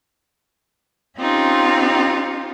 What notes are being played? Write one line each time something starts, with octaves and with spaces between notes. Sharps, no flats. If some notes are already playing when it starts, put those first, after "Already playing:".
C4 C#4 D#4 F4 G4